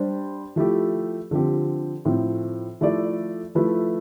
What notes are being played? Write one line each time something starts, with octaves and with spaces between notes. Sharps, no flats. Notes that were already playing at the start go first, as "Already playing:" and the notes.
Already playing: G3 D4 G4 C5
F3 A3 E4 G4
D3 F3 C4 G4
A2 F3 C4
F3 A3 E4 A4 D5
F3 A3 E4 B4